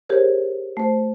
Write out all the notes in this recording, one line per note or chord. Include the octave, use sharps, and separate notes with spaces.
G4 G#4 A#4 C5 C#5
A3 C5